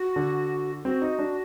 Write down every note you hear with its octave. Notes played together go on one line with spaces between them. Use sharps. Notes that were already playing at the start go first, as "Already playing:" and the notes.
Already playing: F#4
D3
C4 F#4
D#4
D4